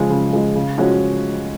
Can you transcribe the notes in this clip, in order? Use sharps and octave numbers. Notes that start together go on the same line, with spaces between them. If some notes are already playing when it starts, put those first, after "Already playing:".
Already playing: C#3 F3 G#3
C#3
F3 G#3
C#3
F3 G#3 C#4 F#4